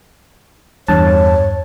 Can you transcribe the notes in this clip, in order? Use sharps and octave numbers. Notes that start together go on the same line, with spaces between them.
E2 G2 C#5 A5